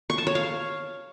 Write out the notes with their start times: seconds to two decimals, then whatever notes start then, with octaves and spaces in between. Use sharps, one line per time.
0.10 C#6
0.18 A5
0.27 C#5
0.35 F5